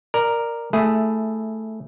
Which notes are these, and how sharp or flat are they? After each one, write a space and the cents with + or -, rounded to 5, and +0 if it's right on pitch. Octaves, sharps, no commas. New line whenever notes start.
A#4 +0 D5 +15
A3 +0 E4 -10 G#4 +0